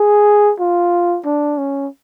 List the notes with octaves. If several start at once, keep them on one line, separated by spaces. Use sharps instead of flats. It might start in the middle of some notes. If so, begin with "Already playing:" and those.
Already playing: G#4
F4
D4
C#4